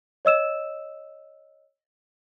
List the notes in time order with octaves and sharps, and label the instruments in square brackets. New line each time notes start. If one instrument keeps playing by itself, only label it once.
[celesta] C#5 D#5 E6 E7